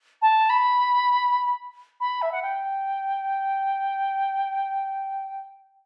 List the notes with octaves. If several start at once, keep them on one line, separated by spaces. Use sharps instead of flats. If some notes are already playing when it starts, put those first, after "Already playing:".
A5
B5
B5
E5
F#5
G5